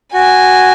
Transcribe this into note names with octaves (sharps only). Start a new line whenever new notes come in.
F#4 G#5